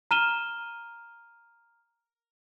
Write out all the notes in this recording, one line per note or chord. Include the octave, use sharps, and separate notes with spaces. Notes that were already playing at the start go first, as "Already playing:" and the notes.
A#5 F6 D#7 E7 G7